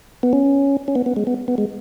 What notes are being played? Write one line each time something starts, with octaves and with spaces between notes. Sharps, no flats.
B3
C#4
C#4
B3
B3
G#3
B3
B3
G#3